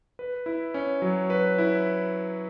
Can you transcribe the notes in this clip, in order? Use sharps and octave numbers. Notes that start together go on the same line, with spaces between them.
B4
E4
C#4
F#3
B4
E4